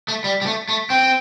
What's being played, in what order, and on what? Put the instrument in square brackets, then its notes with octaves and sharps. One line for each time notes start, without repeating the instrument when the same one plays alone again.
[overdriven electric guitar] A3
G3
G3
A3
A3
[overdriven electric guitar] C4 [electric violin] G5